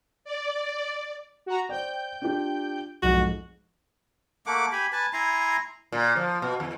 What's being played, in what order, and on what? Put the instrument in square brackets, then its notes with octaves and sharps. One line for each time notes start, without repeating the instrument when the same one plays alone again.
[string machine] D5
[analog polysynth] F#4 A#5
[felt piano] C5 D5 [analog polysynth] G5 G6
[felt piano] D4 F4 G4
[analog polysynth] B1 [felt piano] F2 G#2 [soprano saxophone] F#4
[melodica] A3 A#3 F#5 D6
G4 G#5 B5
B4 G#5 A5
E4 G#5 A#5 C6
[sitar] A#2
F3
B2
E2